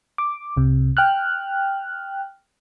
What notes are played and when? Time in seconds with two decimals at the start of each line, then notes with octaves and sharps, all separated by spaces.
0.18 D6
0.57 C2 C3
0.97 G5 F6 F#6